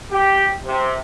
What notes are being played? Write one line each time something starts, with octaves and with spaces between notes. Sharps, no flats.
G4
C3